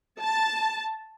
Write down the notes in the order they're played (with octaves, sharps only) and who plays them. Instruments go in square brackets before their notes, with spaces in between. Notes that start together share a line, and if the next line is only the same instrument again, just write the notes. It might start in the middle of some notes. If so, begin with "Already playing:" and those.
[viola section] A5